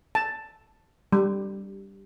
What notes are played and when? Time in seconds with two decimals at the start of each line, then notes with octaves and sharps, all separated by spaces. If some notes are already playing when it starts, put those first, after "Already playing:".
0.15 A5
1.12 G3